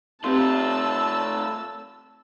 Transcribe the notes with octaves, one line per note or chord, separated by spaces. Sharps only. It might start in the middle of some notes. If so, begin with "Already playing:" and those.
A3 C4 F4 G4 B4 A5 E6